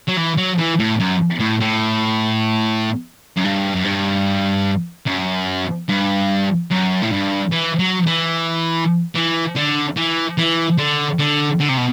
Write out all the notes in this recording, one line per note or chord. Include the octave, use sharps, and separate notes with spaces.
F#3
E3
F#3
E3
A2
F#2
A2
A2
F#2
G2
F#2
G2
F#2
G2
F#2
A2
G2
E3
F#3
E3
E3
D3
E3
E3
D3
D3
D3
C3
B2